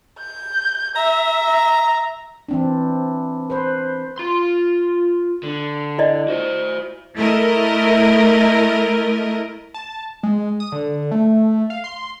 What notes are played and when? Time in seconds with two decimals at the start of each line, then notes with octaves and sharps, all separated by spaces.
0.20 G6
0.96 E5 A#5
2.49 E3 C4 D4
3.50 B4 C5
4.18 F4 C6
5.43 D3
5.98 E4 D5 D#5
6.28 F#4 C5
7.17 A3 E4 A#4 D#5
9.74 A5
10.23 G#3
10.60 D#6
10.72 D3
11.11 A3
11.70 F5
11.84 C6